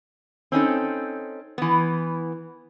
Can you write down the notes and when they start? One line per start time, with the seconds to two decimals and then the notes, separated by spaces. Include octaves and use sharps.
0.52 C4 C#4 D#4 A4
1.58 E3 B3